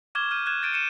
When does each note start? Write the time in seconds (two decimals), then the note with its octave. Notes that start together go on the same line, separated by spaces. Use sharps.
0.15 C#6 D6 F6 G#6 E7 G7
0.31 F6 G6 D#7
0.46 F6 F#6 G#6 E7
0.62 G6 A6 D7 D#7
0.73 C#7 D#7 E7